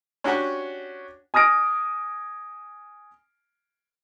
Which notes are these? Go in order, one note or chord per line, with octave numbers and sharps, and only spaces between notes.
C#4 D4 F#4 G4 F#5 G#5
G#5 D#6 F6 A#6 D7